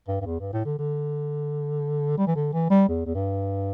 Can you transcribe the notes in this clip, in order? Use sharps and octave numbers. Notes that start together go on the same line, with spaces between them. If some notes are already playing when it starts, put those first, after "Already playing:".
G2
G2
E2
G2
A2
D3
D3
G3
E3
D3
E3
G3
E2
E2
G2